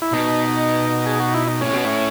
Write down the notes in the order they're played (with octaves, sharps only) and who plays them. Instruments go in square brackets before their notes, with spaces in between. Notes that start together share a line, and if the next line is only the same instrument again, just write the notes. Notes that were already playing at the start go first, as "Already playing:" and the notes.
[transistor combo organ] E4
[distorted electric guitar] B2 [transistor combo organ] D#4
[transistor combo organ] G#4
F#4
E4
D#4
[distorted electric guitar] A2 [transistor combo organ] C#4
[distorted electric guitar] B2
A2